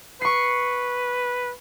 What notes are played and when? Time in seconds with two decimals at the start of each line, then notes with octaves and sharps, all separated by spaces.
0.22 B4 C#6 C7